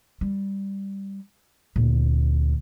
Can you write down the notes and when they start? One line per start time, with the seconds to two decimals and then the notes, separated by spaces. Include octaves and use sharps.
0.21 G3
1.76 D2 A#2